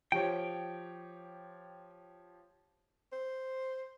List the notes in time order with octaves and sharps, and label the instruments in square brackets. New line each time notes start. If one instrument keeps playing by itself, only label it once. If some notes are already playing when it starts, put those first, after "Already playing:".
[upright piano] F3 G4 C#5 [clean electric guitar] G5
[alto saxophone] C5